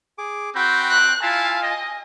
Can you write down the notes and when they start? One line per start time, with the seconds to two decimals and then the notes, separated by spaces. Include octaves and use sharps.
0.18 G#4 D6
0.56 C4 F#4 G5 B5
0.91 F#6
1.23 E4 F4 F5 G#5 A5
1.63 D#5